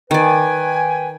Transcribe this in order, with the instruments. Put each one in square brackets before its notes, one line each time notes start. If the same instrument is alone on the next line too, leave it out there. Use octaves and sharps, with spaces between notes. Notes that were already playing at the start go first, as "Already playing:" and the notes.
[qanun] D#3 D5 [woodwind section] B4 G5 G#5